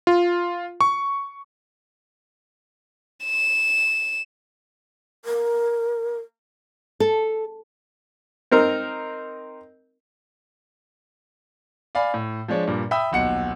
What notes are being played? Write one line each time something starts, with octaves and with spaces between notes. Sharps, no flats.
F4
C#6
E7
A#4
A4
C4 D#4 A#4
D5 F5 G#5 B5
A2
F3 G#3 D4 C#5
G2 A#2
E5 G5 B5 D#6 E6
D#1 B1 F#5 C#7